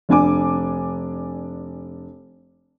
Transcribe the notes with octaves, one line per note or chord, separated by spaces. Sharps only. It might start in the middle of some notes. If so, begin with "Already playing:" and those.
F1 D4 G#5 D6